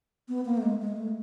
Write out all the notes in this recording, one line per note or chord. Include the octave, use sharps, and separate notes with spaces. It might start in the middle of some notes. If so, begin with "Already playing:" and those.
B3
A#3
A3
G#3
G#3
A3